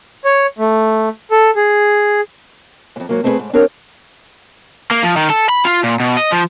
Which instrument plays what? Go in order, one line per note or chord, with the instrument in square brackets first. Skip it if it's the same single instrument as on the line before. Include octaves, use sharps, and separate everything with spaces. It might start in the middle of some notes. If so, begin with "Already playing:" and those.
[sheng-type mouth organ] C#5
A3
A4
G#4
[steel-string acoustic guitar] F2 G#2
G#2 F#3 A#3
A3 C4 D4 E4 G#4 B4
G#2
C4 D4 G4 A#4 C#5
[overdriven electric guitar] A#3
F3
D#3
A4
B5
F4
A#2
B2
D#5
F3